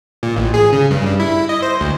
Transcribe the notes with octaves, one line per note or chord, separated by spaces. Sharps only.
A#2
A1
G#4
C#3
G2
G2
E4
D#5
C5
D2